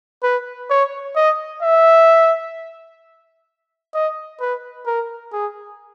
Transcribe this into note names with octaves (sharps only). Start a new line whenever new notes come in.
B4
C#5
D#5
E5
D#5
B4
A#4
G#4